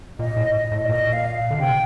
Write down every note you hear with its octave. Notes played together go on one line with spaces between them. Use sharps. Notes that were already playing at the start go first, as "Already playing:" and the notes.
A#2 D#5
A2
D#5
A2
D5
A#2 D#5
F5
F5
D3
C3 G5